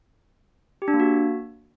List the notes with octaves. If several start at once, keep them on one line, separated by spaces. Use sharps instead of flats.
G4
D4
A#3
F#4